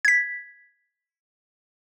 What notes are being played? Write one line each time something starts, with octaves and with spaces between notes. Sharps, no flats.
G#6 B6